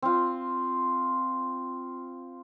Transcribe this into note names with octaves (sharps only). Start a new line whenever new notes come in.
C4 F4